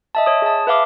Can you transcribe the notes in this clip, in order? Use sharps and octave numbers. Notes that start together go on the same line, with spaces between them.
D#5 E5 A5
C#5 D#6
G#4 A5
B4 E5 F5 D6